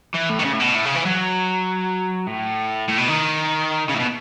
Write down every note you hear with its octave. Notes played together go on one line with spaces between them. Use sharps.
E3
A2
D#3
C#3
A2
B2
A2
C#3
E3
F#3
A2
A2
B2
D#3
C#3
A2
B2